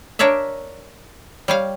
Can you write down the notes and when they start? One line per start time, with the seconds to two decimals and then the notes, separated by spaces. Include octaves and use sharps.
0.19 D4 A#4 C#5 D5 E5
1.48 G3 C#5 F5